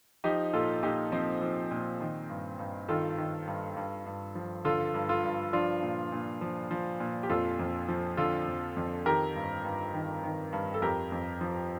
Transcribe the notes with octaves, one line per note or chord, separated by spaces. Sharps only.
F3 D#4 G4
A#2 F4 A4
A#2 D#4 G4
F3 C4 D#4
F3
A#2
D#3
G2
G2
D#3 F4 A4
D#3
G2
G2
G2
F3
D3 F4 A4
G2
F4 A4
G2
F3 D4 F4
A#2
A#2
F3
F3
A#2
G4
F2 F4 A4
F2
F3
D3 F4 A4
F2
F2
D#3 G4 A#4
G2
G2
D#3
D#3
G2
A4
F2 G4 A#4
F2
F3